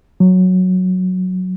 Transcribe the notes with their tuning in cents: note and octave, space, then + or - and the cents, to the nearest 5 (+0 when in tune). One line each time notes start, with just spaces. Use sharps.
F#3 -5